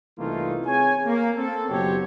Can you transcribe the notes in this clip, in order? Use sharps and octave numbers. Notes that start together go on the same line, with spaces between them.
C2 E3 A3 A#3 D#4 F4
C4 G#4 C#5 G#5
A#3
C4 A4
F#1 B2 F#3 C4 G4 C#5